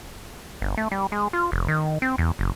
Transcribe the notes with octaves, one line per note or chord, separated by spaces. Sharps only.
G1
A3
G3
G#3
F4
F1
D#3
C4
E2
F#1